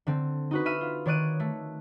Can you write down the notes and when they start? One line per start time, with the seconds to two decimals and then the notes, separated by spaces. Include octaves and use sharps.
0.07 D3 C4
0.51 D#4 F#4 B4
0.66 E5 B5 F6 D#7 E7
0.81 F4
1.06 D#3 C#5 D5 F#6 D#7
1.40 A3